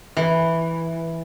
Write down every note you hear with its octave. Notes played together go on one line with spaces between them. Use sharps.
E3